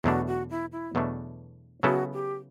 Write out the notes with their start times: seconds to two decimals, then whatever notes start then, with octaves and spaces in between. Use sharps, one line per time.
0.04 E2 B2 F#3 A3 D4 F#4
0.27 F#4
0.50 E4
0.72 E4
0.95 E2 B2 F#3 A3 D4
1.83 C#3 F#3 B3 E4 F#4 A4
2.13 G4